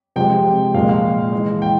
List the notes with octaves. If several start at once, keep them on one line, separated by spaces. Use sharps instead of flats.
C3 F3 G#3 G5
A#2 F3 G#3 F5
F5
E3 G#3
G5